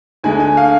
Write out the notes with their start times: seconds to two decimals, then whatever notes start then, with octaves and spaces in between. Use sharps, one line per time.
0.24 D2 D3 G#3 G#5
0.40 G#5
0.57 F5